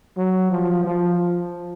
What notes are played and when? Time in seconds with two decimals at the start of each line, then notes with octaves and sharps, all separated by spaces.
0.17 F#3
0.52 F3
0.85 F3